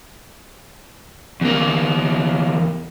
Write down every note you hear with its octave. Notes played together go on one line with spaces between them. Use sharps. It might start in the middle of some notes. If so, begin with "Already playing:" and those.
E2 A#3